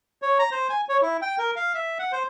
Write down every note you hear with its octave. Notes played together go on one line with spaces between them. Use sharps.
C#5
A#5
C5
G#5
C#5
E4
G5
A#4
F5
E5
F#5
C5